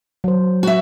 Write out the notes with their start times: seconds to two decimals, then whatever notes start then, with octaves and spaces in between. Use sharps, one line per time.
0.24 F#3 C5
0.63 F#4 E5